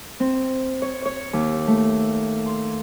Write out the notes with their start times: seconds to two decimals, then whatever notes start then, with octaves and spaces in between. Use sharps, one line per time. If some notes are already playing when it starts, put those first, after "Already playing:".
0.20 C4
0.82 C#5
1.05 C#5
1.33 D#2
1.68 A3
2.46 C6